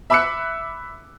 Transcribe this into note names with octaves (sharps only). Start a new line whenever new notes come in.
E5 B5 D6 E6 F#6 C#7